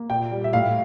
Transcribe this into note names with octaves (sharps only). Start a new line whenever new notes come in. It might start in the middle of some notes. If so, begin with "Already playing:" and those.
Already playing: A#3
A#2 G5
G3
E5
A2 F5